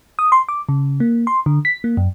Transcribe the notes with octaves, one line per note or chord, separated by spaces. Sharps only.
D#6
C6
D6
C#3
A#3
C6
D3
B6
A#3
F#2